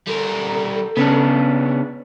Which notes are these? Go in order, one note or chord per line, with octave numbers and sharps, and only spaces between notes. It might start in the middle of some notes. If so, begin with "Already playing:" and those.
G3 A4 A#4
C#3 B3 C#4 D4